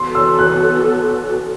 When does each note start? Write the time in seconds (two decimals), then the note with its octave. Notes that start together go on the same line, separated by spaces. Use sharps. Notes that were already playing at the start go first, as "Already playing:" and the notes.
Already playing: B3 F#4 A4 C6
0.15 E6
0.39 F#6